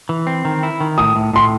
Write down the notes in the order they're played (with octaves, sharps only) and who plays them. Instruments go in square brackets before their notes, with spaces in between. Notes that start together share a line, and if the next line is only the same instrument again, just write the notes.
[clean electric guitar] E3
C4
D#3
E4
D#3
[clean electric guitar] A2 [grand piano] D#6
[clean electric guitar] A2
[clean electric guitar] A2 [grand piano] C6